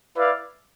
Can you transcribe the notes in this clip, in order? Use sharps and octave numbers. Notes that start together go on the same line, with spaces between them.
E4 B4 D5 F5